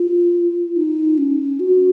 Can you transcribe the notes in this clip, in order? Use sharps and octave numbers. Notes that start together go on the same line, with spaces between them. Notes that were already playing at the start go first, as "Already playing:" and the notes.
Already playing: F4
D#4
C#4
F#4